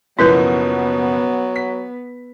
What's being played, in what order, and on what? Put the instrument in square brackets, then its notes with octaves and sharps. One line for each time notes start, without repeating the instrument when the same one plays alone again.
[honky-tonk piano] F#1 B2 F3 [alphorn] F#3 [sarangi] B3 [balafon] E4 A#4 B4
[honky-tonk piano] B6